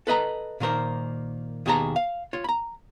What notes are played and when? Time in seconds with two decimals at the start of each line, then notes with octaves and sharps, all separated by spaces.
0.07 A4 B4 D#5 A#5
0.60 A#2 D#3 A#3 A#4 C5
1.66 D#2 B2 G#4 A5 A#5
1.96 F5
2.33 F4 C#5
2.44 A#5 B5